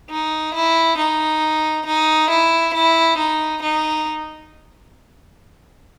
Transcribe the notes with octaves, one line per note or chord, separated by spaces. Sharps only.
D#4
E4
D#4
D#4
E4
E4
D#4
D#4